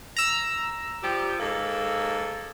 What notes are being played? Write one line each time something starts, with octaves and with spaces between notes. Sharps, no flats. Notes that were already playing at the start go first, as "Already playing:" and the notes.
A#5 E6
F3 G3 G4
G#2 A#3 A4